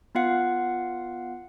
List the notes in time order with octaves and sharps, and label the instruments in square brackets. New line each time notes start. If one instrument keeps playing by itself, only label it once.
[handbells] B3 F4 F5 F#5